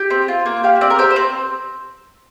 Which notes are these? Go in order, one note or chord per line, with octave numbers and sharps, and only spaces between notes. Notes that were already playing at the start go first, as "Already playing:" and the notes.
Already playing: G4
C4
F4
A#3
G4 F5
C4 D5
A#4
G4 C5
C5
C4